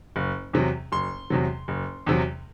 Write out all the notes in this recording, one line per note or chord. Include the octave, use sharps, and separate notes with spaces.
F#1
E2 C3 F#3
F#1 C6
E2 C3 F#3
F#1
E2 C3 F#3